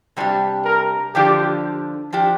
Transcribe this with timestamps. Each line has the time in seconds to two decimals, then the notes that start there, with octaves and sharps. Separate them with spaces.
0.17 C3 G3 D4 G4
0.65 A#4
1.15 D3 F3 D4 F4 G4
2.13 F3 D4 G4